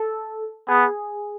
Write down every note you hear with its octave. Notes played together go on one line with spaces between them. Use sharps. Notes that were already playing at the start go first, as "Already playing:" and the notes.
Already playing: A4
B3 G#4